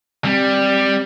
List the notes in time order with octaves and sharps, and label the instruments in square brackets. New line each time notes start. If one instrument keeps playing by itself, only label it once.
[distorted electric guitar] G3 [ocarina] C4